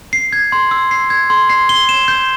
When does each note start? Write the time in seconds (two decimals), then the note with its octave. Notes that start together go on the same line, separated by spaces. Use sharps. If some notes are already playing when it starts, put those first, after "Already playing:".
0.13 C7
0.33 G#6
0.52 C6
0.71 E6
0.91 C7
1.10 G#6
1.30 C6
1.49 C7
1.69 G7
1.89 E7
2.08 G6